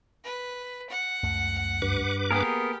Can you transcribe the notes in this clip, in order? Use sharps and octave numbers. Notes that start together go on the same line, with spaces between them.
B4
F#5
C#2 F#2 A3
G2 B4 D6
A#3 B3 G4 G#4 A#4